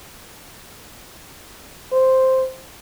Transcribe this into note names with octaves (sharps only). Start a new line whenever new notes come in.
C5